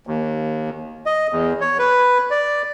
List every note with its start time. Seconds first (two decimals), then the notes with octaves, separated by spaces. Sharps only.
0.07 D#2
1.06 D#5
1.32 E2
1.61 C#5
1.79 B4
2.31 D5